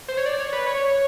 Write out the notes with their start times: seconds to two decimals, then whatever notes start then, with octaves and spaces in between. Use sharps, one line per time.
0.08 C5
0.17 C#5
0.26 D5
0.39 C#5
0.53 B4
0.66 C#5